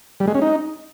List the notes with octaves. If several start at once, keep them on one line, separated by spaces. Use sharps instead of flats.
G3
G#3
C#4
D#4